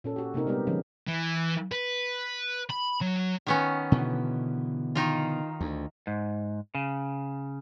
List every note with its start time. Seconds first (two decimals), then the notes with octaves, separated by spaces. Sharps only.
0.04 A#2 C#4 A4
0.16 F#4 G4
0.34 C3 A#3 C4 D#4 A#4
0.47 G3 G#3 B3 G4
0.67 D3 F3 G#3 C#4
1.08 E3
1.72 B4
2.70 B5
3.01 F#3
3.47 D#3 B3 C#4
3.92 B2 D3 E3
4.95 D#3 D#4 F4
5.60 D2
6.07 G#2
6.75 C#3